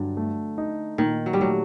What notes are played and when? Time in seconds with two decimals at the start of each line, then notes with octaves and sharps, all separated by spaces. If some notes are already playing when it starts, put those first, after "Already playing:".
Already playing: G2 D3 F#3
0.17 A3
0.58 D#4
0.98 A#2 D#3
1.26 F#3
1.33 G3
1.40 F#3 A3